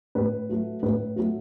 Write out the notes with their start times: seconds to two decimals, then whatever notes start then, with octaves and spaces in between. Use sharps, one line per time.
0.15 A2 B4
0.49 F#3 A3
0.82 A2 B4
1.16 F#3 A3